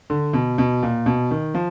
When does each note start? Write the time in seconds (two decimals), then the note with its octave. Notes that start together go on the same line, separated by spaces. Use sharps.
0.10 D3
0.33 B2
0.58 B2
0.83 A#2
1.06 B2
1.31 D#3
1.55 F3